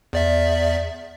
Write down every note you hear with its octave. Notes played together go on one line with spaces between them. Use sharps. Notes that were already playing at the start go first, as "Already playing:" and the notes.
E2 D5 E5